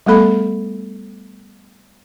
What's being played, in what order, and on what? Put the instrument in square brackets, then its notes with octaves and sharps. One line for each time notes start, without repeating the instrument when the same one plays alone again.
[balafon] G3 A3 B3 A4 B5